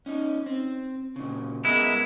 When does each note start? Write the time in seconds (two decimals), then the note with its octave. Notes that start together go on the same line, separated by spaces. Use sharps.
0.06 C#4 D#4
0.46 C4
1.16 A#2 C#3
1.65 G#3 B3 E4 A#4